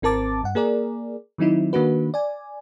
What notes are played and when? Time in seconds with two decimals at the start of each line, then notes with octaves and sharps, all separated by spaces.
0.02 G#1 C4 A#4 A5 D6 A6
0.43 G2 F#5
0.55 A#3 G#4 A#4 D5
1.38 D#3 F#3 C4 D#4 E4
1.73 D#3 A#3 D4 F#4 B4
2.14 D5 G#5